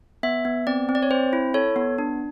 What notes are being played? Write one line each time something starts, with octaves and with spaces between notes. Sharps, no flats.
B3 E5
B3
C4 D5
C4
D5
C#5
C4 C5
E4
A4 C#5
B3
D4